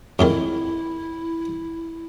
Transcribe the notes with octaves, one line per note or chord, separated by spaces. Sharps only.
F2 G#2 D#3 E4